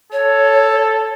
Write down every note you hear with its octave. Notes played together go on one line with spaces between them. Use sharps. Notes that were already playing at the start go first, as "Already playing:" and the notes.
A4 C#5